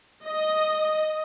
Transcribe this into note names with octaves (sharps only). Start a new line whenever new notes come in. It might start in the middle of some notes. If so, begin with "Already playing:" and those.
D#5